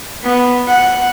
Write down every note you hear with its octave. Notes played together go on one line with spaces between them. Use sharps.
B3
F#5